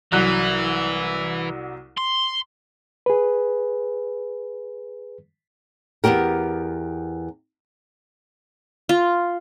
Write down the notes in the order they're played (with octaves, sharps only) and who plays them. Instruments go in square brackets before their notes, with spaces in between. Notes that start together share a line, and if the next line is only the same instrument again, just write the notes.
[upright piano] C2 F#3 F#6 [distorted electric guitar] E3
[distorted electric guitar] C6
[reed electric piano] G#4 B4
[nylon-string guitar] E2 B2 B3 G4 A#4
[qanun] F4